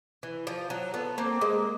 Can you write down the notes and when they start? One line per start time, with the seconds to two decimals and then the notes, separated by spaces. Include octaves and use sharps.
0.23 E3
0.47 F3
0.70 F#3
0.94 A3 B3
1.18 A#3 C4
1.41 G#3 A#3